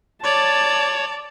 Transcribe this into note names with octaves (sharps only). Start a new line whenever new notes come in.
C#5 D5 A5